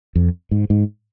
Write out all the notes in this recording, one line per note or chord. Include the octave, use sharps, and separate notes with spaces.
F2
G#2
G#2